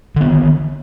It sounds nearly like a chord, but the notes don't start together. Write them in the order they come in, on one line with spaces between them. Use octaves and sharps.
D3 B3 D#3